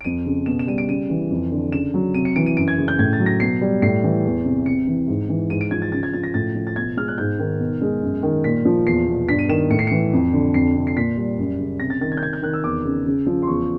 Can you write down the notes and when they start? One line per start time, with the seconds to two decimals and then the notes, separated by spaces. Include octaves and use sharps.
0.01 D7
0.04 F2 D#7
0.26 C#3
0.46 B2 E7
0.59 E7
0.67 G3 D#7
0.78 D7
0.89 C#3 D#7
1.10 E3
1.30 F2
1.52 D3
1.72 C#3 E7
1.94 F#3
2.14 C3 D#7
2.25 C#7
2.36 E3 D7
2.46 D#7
2.57 F#2 D7
2.68 G#6
2.78 C#3
2.88 G6
2.99 A2 G#6
3.13 A6
3.20 F#3
3.26 A#6
3.40 B2 C7
3.61 G3
3.82 A2 C7
4.04 E3
4.25 E2
4.45 C3
4.66 C3 C#7
4.87 E3
5.08 G#2
5.29 E3
5.50 G#2 D#7
5.61 D7
5.71 F3 G#6
5.82 A6
5.92 C#3 A6
6.03 G#6
6.13 F3 A6
6.23 A#6
6.34 A2 A6
6.55 F3
6.67 A6
6.76 B2 G#6
6.97 G#3 F6
7.08 F#6
7.18 G#2 G6
7.39 D#3
7.60 B2
7.82 G#3
8.02 F#2
8.23 D#3
8.44 A#2 B6
8.65 F3
8.87 E2 C7
9.07 B2
9.28 G2 B6
9.39 D#7
9.49 D#3 E7
9.70 A2 C#7
9.79 C7
9.87 E3 C#7
10.13 F2
10.33 D3
10.54 F2 C7
10.75 C3
10.87 C7
10.96 A#2 B6
11.17 G3
11.38 F#2
11.59 C#3
11.80 C3 A#6
11.90 A6
12.01 D#3 A6
12.12 G#6
12.17 G6
12.22 C3 G#6
12.33 G6
12.42 D#3 F#6
12.53 E6
12.64 E2 D6
12.85 C#3
13.06 C#3
13.26 F3
13.42 C6
13.47 E2 C#6